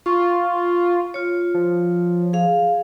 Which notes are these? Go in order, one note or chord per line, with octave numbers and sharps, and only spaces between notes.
F4 C#6
F4 C#5
F3
G#4 F5